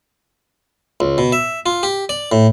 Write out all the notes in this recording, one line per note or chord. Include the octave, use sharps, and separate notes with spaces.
C#2
B2
E5
F4
G4
D5
A2